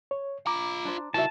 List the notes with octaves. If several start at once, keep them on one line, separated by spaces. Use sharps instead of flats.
C#5
F4 A#5 B5 D6
D4 C5
D#4 E4 F#4 A#4 E5 A5